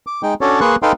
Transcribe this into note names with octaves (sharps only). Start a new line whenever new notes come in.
D6
G#3 D#4 G5
C#4 D4 F#4 A4 C#5 D5
A#3 G#4 B4 C6 C#6 F#6
D#4 A4 B4 F5 G5 C6